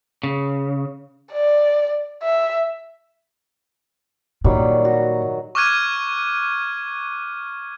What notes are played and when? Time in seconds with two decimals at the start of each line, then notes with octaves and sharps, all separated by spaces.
0.23 C#3
1.31 D5
2.23 E5
4.44 A#2 D#3 F#3 G3
4.85 F#4
5.55 C#6 D6 F6 F#6 G#6 D#7